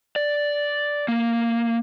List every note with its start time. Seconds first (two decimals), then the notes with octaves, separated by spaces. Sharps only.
0.16 D5
1.08 A#3